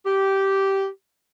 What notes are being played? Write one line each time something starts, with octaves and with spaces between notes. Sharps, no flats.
G4